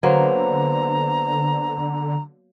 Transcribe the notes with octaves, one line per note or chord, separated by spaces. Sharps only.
D3 F#3 A#3 B3 B4 C5 A#5